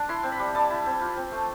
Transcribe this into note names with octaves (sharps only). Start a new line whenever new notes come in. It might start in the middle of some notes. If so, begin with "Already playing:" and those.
Already playing: D4
E4 C6
C4
B5
G3
G3 A5
E4
C4
F4
C4
A3